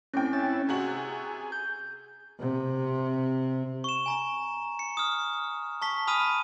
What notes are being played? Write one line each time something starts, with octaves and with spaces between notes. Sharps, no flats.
A2 C4 C#4 G5
C#4 E4 A6
C3 F#4 G#4 F#7
G6
C3
C#6 E7
G#5 A#5 C#6
C#7
D#6 F6
A5 C#6 B6
G#5 B5 D#6 F6 B6 D#7